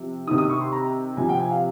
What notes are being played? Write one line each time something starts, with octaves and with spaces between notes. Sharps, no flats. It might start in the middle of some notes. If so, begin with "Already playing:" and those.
Already playing: C3 F3
C3 D#3 D#6
D#6
C#6
C6
A#5
C3 F3 G#5
G5
G#5
F5